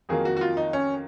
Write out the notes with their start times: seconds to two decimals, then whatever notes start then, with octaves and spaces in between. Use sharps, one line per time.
0.09 F2 D#3 F#3 A#3 G#4
0.25 F#4
0.37 F#4
0.41 F4
0.57 D#4
0.73 C#4